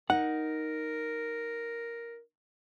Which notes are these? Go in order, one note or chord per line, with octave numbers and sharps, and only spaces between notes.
D#4 A#4 F#5